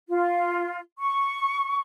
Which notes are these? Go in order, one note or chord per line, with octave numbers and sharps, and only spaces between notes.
F4
C#6